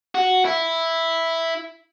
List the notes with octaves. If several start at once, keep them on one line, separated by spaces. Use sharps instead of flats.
F#4
E4